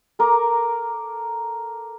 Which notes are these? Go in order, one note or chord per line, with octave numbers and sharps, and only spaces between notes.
A4 A#4 A#5 D6